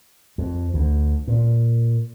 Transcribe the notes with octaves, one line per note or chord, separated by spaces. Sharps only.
F2
D2
A#2